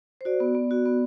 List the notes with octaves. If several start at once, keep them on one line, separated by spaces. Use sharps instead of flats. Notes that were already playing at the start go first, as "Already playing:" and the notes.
C5
F#4 D5
B3
B3
F#4
B3